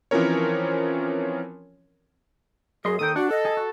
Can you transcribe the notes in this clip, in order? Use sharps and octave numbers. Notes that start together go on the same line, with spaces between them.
E3 F3 C4 C#4 A#4 C#5
F#2 G#4 D#5 C6
D#2 D#3 A4 G5 D#6
D4 F#4 F#5
A4 D#5
G#4
F#4